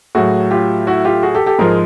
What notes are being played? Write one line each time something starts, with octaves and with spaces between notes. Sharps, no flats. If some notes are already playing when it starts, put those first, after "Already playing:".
A2 F#3 F#4 G#4
F4 G4
E4 F#4
F4 G4
F#4 G#4
G4 A4
G4 A4
G#2 F3 G#3 G#4 A#4